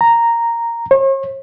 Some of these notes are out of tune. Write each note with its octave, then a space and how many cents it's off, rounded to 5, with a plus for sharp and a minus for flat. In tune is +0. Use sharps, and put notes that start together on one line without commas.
A#5 -5
C#5 -45